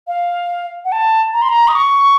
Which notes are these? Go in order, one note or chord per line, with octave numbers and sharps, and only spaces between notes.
F5
F#5
A5
A#5
C6
A#5
D#6
C#6